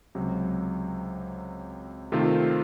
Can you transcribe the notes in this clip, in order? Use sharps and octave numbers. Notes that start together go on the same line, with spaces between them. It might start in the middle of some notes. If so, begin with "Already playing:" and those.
C#2 C3 F#3
C3 D#3 A3 C4 F4